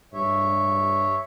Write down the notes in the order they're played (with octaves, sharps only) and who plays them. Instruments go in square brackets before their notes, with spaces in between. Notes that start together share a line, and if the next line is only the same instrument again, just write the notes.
[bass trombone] G2 [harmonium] C#5 E5